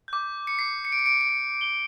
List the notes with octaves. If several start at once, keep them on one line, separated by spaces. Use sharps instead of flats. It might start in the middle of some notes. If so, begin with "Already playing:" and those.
D6 G6
C#7
C7
C#7
D7
C#7
D7
C#7
D7
C#7
G7